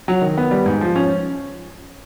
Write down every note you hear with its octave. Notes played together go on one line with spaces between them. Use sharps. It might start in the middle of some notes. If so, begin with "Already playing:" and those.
F#3
D#3
B3
G3
G#2
F3
C#4